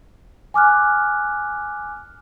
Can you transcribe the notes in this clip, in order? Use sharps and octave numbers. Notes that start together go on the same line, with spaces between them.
G#5 D6 F6 F#6